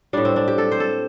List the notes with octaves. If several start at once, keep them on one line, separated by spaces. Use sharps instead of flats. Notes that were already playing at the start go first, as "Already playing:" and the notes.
A2 G3 D4
C4
D4
G4
A4
C5
A4